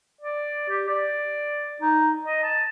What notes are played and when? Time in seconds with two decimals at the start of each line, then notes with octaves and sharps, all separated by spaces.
0.21 D5
0.69 G4
0.88 D5
1.82 D#4
2.24 D#5
2.43 A5